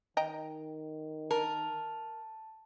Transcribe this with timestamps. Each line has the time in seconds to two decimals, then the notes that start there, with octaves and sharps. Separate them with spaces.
0.17 D#3 D#5 G5 A#5
1.31 A#4 A5